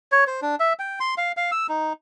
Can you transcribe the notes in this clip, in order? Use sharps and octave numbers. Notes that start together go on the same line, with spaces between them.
C#5
C5
D4
E5
G5
C6
F5
F5
E6
D#4